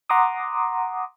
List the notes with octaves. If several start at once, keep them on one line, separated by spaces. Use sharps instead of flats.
F#5 A#5 C6 D6 D#6